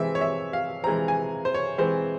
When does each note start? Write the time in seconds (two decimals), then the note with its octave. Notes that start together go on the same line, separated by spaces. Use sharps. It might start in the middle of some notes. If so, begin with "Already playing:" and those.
Already playing: E3 G#3 C4 E5
0.15 C#5
0.21 E5
0.53 F5
0.84 E3 G#3 C4 A#5
1.08 G#5
1.45 C5
1.54 C#5
1.78 E3 G#3 C4 C5